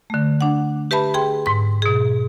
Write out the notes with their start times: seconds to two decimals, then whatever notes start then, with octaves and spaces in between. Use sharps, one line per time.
0.10 D3 A3
0.41 D4 F#5
0.91 G4 B4 E5 A5 B5
1.14 G#4 G5 C6
1.46 G#2 C6
1.82 B2 G#4